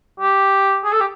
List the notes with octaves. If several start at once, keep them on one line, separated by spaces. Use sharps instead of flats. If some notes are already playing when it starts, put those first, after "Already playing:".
G4
G#4
A4
G4